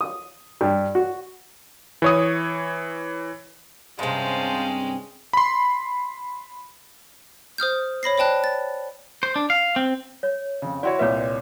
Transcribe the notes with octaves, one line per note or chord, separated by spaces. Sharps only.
D#6
G2
F#4
E3 C#5 D#6
G2 C3 G#3 C#4 C5 F5 A5
B5 C6
C5 D#6 F6 G6
C#5 B5 A#6 C7
C5 D5 G5 A5 F#6
A6
C5
D4
F5
C4
C#5
F2 C#3
E4 F#4 C#5 D5 C6
C2 A#2 B4 C#5 E5